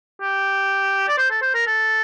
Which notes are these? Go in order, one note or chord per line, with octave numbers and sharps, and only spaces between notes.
G4
D5
C5
A4
C5
A#4
A4